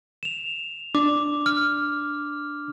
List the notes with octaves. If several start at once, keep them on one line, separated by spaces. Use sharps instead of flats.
E7 F7
D4 D6
F6